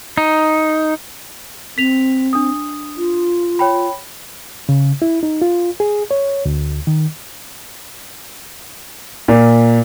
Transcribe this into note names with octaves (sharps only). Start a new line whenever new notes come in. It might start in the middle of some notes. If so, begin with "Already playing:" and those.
D#4
C4 B6 F7
D4 D#6
F4
C#5 G5 B5
C#3
E4
D#4
F4
G#4
C#5
D2
D#3
A#2